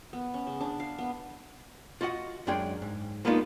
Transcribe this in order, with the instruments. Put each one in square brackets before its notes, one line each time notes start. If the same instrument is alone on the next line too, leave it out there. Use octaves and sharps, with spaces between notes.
[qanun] B3
C#4
C#3
D4
F5
B3
[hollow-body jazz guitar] F4 F#4 D#5 F#5
F#2 G#3 D4 G#4 G5 C6
G#2
G#3 A#3 B3 D4 D#4 F4